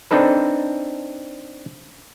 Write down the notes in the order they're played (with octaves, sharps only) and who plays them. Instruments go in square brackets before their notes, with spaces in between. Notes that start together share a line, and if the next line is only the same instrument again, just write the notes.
[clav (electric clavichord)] C4 D4 D#4 A4 B4